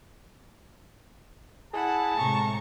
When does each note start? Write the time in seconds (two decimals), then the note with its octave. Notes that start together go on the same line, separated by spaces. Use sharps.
1.73 E4 G#4 F#5 A5
2.16 A2 C3 G#3 A#5 C#6